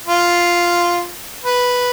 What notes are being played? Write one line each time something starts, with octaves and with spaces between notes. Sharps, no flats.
F4
B4